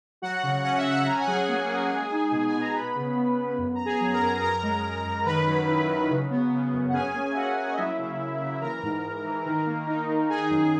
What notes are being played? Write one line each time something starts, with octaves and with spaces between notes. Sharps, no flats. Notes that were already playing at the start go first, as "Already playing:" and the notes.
F#3 F#4 F#5
C#3
C#4 F#5
E5
C#4
F#4 F#5
C#4 A#5
G#5
F#5
F#3 G#4 G#5
A#3
A#3
G#3
D#4
B2
G#5
B2
A#5
B3 B4 B5
C#3
B3
B3
F#2
F#2 A#5
G#4 G#5
F#3
A#4 A#5
F#2
F#2 A#4 A#5
G#3
G#3
F#2
D#3 B4 B5
F#3
E4
F#3
C#3
B3
C#3
F#2
F#5
C#4 G#4 G#5
A#3
E5
A#3 F#4 F#5
A#3
D#5
F#3 E4 E5
C#3
C#3
C#3
E3 A#4 A#5
G#2
G#2
E3
D#3
A#3
D#4
D#3
D#4 G#4 G#5
F#2